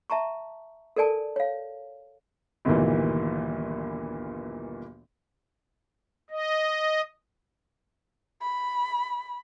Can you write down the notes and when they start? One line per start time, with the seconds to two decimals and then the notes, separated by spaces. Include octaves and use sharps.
0.10 E5 A5 A#5 C#6
0.96 A4 A#4 D5 G#5 A5
1.36 C#5 F5
2.65 G1 D2 G2 A#2 D#3 E3
6.31 D#5
8.42 B5